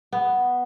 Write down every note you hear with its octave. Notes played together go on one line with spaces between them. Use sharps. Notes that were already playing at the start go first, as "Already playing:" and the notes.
B3